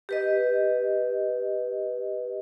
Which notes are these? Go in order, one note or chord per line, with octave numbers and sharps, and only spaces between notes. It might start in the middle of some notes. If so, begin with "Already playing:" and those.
G4 B4 D#5